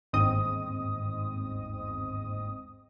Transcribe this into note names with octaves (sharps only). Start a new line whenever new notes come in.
G1 D#2 G#2 C4 D#5 D#6